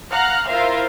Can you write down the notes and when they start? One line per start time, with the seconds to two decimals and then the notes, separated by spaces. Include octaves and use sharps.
0.11 F5 F#5 A#5 F6 F#6
0.48 E4 F4 A#4 C5 E5 F5